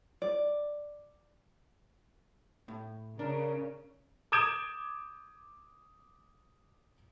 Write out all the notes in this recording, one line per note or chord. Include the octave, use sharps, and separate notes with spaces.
D5
A2
C#3 D4 A#4
D6 D#6 G6 G#6 D7 E7